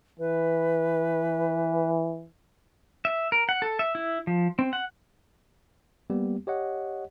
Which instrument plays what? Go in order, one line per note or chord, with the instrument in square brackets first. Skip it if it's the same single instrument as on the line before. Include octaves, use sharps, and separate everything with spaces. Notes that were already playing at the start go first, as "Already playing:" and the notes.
[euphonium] E3 [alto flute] B4
[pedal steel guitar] E5
A#4
F#5
A4
E5
E4
F3
C4
F#5
[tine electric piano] G3 A#3 B3 G4
G4 C#5 D#5 F#5